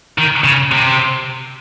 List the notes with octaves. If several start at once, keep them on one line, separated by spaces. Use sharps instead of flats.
D#3
C#3
C3